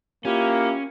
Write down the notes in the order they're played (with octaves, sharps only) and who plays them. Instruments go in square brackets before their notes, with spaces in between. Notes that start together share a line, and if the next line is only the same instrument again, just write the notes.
[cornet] A#3 [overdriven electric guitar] C#4 [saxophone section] E4 F4 G4